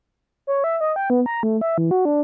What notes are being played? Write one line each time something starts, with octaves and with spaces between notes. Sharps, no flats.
C#5
E5
D#5
G5
B3
A#5
A3
E5
E3
F#4
D4